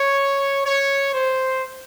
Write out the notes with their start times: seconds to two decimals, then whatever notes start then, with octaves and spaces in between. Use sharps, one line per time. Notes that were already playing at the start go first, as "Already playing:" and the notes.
Already playing: C#5
0.65 C#5
1.13 C5